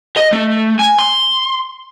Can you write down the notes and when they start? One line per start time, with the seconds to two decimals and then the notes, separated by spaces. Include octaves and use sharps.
0.17 D#5
0.32 A3
0.79 G#5
0.99 C6